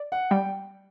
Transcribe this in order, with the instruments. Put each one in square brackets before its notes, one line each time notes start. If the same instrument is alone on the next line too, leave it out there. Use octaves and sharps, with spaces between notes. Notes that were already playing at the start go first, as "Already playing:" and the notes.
Already playing: [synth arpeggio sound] D5
[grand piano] F#5
[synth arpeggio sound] G3 [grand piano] G5